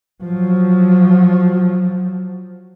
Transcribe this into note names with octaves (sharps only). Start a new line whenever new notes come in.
F3 F#3